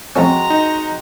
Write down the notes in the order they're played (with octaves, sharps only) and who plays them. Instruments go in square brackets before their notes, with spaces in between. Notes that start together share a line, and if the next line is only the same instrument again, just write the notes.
[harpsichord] F2 A2 C#4 [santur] G#3 C4 F#4 [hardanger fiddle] A#5
[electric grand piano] D#4